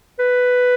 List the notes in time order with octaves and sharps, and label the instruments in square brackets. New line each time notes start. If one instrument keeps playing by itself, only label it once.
[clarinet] B4